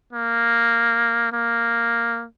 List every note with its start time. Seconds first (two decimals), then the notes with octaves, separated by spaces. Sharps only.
0.13 A#3
1.32 A#3